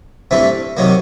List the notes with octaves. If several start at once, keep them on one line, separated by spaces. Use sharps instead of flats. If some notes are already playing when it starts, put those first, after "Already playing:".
G2 E3 A3 C4
C3 D#3 F#3 A#3